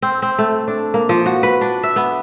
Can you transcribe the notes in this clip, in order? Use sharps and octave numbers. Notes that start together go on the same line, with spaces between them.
C4
C4
A3
D4
A#3
F3
F#4
B4
D4
E5
B3